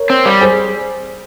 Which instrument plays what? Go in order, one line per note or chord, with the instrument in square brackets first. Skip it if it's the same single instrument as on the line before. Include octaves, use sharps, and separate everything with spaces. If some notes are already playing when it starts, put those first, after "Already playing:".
Already playing: [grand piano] A#4 C#5
[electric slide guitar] C4
G3
[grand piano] G#4 C5